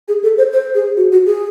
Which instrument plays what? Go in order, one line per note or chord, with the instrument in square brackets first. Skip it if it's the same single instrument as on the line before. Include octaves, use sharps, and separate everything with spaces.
[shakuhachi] G#4
A4
C5
C5
G#4
F#4
F#4
G#4